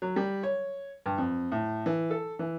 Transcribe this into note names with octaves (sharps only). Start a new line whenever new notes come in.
F#3
G3
C#5
G2
F2
A2
E3
A4
E3